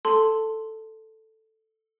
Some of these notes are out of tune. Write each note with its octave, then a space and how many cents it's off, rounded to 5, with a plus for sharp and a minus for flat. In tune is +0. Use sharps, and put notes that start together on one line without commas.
A4 +0 A5 +5 C6 +0